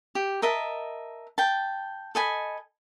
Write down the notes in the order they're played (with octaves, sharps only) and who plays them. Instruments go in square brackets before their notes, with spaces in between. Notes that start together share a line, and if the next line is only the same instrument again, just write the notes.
[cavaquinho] G4
A#4 D#5 E5 A5
G5 A5
A4 D#5 G#5 B5